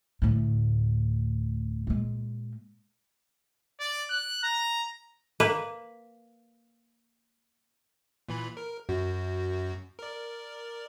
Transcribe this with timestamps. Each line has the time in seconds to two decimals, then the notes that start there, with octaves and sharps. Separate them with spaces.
0.22 D2 A2
1.87 A#2 G#3
3.80 D5
4.10 F#6
4.43 A#5
5.40 A#3 B4
8.28 A#2 E3 B5
8.57 A#4
8.89 F#2 F#4
9.99 A#4 D5